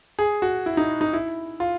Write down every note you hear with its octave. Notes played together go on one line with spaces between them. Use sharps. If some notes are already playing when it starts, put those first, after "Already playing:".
G#4
F#4
E4
D#4
D#4
E4
F4